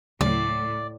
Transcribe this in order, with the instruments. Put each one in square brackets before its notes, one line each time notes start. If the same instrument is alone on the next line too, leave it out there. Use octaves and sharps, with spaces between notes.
[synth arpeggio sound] D2 C#3 F#3 [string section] A2 [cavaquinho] D5